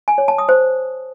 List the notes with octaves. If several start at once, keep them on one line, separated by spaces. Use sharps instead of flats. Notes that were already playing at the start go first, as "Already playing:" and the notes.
G#5
C#5
A5
D#6
C5